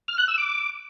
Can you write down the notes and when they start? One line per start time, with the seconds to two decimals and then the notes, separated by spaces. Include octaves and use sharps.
0.08 F6
0.18 F#6
0.28 E6
0.38 D6